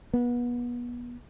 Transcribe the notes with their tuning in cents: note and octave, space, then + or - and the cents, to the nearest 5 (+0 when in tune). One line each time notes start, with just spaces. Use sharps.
B3 -30